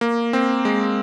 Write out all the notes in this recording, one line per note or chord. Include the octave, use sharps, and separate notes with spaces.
A#3
C4
G#3